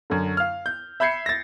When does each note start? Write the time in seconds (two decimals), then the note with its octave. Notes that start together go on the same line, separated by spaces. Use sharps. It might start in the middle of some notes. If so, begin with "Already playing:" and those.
0.10 F#2 D3
0.37 F5 F6
0.66 G6
1.00 E5 B5 G6 G#6 C7 C#7
1.26 A6 A#6